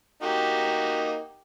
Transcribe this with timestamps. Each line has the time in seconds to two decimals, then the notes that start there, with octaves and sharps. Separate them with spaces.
0.23 A#3 D#4 F#4 G4